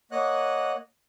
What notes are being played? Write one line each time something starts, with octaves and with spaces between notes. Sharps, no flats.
A#3 C#5 D#5 F#5 F#6